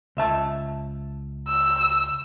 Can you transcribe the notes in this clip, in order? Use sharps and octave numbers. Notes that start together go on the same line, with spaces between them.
C#2 E5 A5
E6